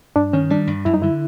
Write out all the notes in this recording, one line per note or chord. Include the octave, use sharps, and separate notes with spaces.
G2 D4
D#3 C#4
G3 D4
G2
F#2 E4
D#4
D3 E4